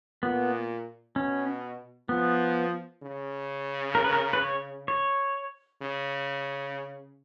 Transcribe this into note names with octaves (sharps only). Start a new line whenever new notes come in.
A#2 B3
B2 C#4
F3 B3
C#3
A#4
B4
A#4
B4
C#5
C#5
C#3